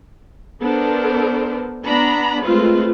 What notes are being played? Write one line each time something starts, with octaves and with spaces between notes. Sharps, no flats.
B3 D4 A4 A#4 C5
B3 D4 A#5 B5
G#3 A3 C4 F4 B4